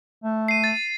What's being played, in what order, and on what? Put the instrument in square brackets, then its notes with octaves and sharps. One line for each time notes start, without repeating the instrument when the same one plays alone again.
[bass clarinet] A3
[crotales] C7 D#7
A6